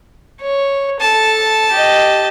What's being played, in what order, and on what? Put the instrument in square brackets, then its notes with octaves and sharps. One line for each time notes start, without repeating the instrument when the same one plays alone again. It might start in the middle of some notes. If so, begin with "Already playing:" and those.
[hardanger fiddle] C#5
[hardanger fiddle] A4 [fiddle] A5
[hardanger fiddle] G4 D#5